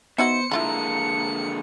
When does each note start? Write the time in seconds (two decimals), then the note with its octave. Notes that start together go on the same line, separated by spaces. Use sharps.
0.18 B3 D#4 E4 F#4 C5 C#7
0.51 D3 G#3 A#3 E4 F4 A#5 B5